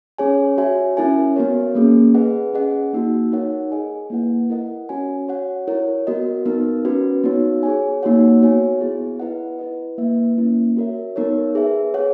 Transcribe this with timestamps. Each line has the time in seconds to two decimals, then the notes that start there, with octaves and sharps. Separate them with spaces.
0.18 C#4 G#4 C#5 G#5
0.58 F#4 C#5 E5 G#5
0.97 C#4 E4 A#4 E5 G#5
1.36 B3 F#4 A#4 C#5
1.75 A#3 C#4 G#4
2.14 G#4 B4 D#5 F#5
2.53 C#4 G#4 D#5 F#5
2.93 A#3 D#4 F#4
3.32 D#4 A#4 C#5 F#5
3.72 G#4 D#5 G#5
4.10 A#3 E4 B4 F#5
4.50 E4 A#4 D#5 F#5
4.89 C#4 F#4 C#5 G#5
5.28 F#4 C#5 F#5
5.67 E4 A#4 C#5
6.07 B3 F#4 A#4 D#5
6.46 B3 D#4 A#4
6.85 C#4 F#4 B4
7.24 B3 D#4 F#4 C#5
7.63 G#4 C#5 G#5
8.02 A#3 D#4 F#4 C#5 F#5
8.41 B3 F#4 C#5 G#5
8.81 B3 E4 G#4
9.19 E4 B4 D#5 F#5
9.59 E4 B4 D#5
9.98 A#3 E4 B4 E5
10.37 A#3 C#4 E4
10.77 F#4 A#4 C#5 E5
11.16 B3 D#4 A#4 C#5
11.55 G#4 B4 E5
11.94 G#4 C#5 F#5